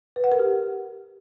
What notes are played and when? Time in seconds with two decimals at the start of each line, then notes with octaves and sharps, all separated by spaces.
0.16 B4
0.24 F#5
0.32 A#4
0.39 G4